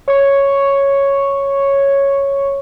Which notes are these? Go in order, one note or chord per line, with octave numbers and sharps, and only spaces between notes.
C#5 C#6